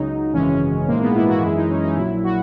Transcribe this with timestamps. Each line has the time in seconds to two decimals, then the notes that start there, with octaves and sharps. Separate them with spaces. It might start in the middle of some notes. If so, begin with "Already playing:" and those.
Already playing: C#2 C#3 F#3 D#4
0.33 G#1 F#2 C#3 E3 G#3 C#4
0.88 A#1 G#2 E3 G#3 A#3
1.02 B3
1.15 E4
1.28 F#4
1.42 F#2 E3 G#3 E4
1.55 D#4
1.69 C#4
1.82 D#4
1.97 A#1 A#2 F#3 E4
2.24 F#4